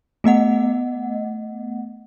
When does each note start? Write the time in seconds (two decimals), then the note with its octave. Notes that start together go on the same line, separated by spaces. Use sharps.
0.24 A3 B3 D#5 F#5